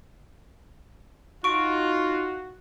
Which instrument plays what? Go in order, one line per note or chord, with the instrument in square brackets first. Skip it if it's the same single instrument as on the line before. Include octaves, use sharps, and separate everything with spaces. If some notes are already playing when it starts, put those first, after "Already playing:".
[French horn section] D#4 [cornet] F4 [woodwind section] F#4 [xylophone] C#6 D7